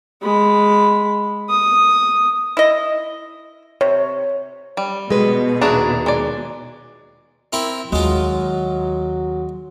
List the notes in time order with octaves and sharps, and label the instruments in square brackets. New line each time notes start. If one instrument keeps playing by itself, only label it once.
[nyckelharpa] G#3 B5
D#6
[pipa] E4 D#5
[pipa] C3 [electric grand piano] C#5
[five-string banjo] G3
[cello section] B2 [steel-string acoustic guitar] G#3 B4
[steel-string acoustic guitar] D#2 G#4 A#5 [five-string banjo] D4 E4 F#4
[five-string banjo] G#3 D5
[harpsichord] C4 E4 A#4
[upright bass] D#2 [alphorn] F#3 [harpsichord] G#3 F4